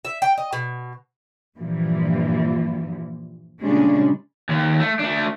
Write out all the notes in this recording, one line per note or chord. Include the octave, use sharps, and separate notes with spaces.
E5
G5
D#5
B2
G2 A#2 E3 F3 G3
A#2 C#3 G3 G#3 C#4 D4
D#2
A3
A3 D4